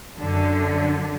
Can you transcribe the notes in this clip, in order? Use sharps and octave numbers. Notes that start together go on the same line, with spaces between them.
F#2 D3